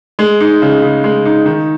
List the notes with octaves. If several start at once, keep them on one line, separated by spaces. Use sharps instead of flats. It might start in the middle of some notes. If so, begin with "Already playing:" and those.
G#3
D#4
C#3
C#3
G#3
D#4
D#3